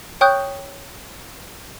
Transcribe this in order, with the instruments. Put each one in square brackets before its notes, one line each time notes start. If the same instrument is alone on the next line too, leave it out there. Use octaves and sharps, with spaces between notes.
[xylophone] C#5 G5 C#6 D#6 F#6 G6